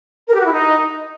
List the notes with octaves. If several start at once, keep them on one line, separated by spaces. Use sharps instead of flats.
A#4
G4
F#4
E4
D#4